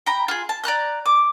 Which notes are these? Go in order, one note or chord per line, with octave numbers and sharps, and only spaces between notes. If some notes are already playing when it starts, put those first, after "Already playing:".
G5 A#5 B5
F4 G#4
A5
D5 A#5 F#6 G6
D6